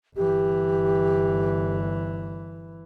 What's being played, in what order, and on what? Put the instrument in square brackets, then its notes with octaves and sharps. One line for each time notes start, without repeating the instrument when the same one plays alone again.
[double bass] G1 E3 [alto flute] G4